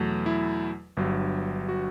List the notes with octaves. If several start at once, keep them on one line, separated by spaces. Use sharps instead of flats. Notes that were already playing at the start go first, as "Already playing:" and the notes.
Already playing: E2 B2 F#3 A3
E4
G1 G2 F#3
F#4